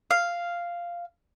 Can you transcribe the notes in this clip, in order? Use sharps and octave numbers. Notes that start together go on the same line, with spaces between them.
F5